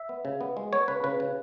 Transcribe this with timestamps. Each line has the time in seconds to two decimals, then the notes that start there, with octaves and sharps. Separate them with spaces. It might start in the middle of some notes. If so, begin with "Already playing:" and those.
Already playing: E5
0.09 B3
0.25 C#3
0.41 B3
0.57 G#3
0.72 B3 C#5
0.88 C#3 B4
1.04 C#3 B4
1.20 C#3